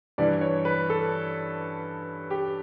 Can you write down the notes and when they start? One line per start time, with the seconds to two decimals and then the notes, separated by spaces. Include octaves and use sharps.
0.18 G2 E3 G3 D5
0.41 C#5
0.65 B4
0.90 A4
2.31 G4